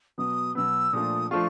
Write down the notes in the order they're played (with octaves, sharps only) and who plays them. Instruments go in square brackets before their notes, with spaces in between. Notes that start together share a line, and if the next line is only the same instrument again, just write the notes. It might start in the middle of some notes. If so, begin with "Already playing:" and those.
[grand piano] B2 F#3 B3 [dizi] D#6
[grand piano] B2 F#3 B3 [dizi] E6
[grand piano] A#2 F3 A3 D4 F4 [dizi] D#6
[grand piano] F3 A3 D4 F4 [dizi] C#6